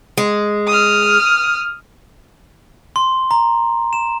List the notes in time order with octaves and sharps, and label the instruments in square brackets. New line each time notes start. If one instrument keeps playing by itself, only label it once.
[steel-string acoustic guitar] G#3
[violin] D#6 F6
[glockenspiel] C6
A#5
E7